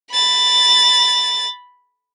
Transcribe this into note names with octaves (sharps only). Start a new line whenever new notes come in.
B5 A6